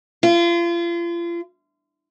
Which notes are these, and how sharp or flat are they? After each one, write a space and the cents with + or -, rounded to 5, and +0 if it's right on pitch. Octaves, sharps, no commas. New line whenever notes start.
F4 -35